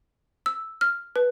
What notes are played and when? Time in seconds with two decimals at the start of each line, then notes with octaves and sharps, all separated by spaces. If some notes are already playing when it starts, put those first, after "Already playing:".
0.46 E6
0.81 F6
1.16 B4